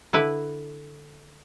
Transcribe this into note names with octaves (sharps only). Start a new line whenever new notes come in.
D3 E4 B4